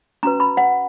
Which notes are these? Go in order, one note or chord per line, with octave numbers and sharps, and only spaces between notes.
C#4 F#4 B4 A#5
B5
F#5